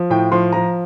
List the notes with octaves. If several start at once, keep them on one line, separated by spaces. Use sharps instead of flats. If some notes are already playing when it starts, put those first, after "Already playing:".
Already playing: F3
A2 G5
F3 C6
F3 A#5